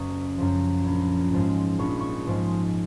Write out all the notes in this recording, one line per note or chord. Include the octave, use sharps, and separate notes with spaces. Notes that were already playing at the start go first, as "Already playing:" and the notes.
Already playing: F#1 F#2 C#6 D#6
F#2 F3
A#1
G#2 F3 G#3
A#1 C#6
D#6
C#6
G#2 F3 G#3